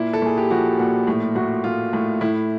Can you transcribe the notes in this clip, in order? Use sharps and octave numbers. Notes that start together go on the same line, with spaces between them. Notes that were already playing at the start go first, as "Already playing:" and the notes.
Already playing: A#2 E4
A4
A#2 G#4
G4
F3 F#4
A#2 F#4
A2
A2 F#4
A2 F4
A2
A2 E4